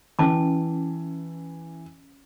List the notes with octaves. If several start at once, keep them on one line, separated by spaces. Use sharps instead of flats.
E3 C#4 A5 D6